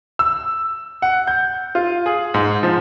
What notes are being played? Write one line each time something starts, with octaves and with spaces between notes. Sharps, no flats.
E6
F#5
G6
F4
G#4
G#2
F3